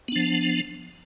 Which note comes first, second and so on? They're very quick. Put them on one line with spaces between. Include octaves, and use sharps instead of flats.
B3 D4 F3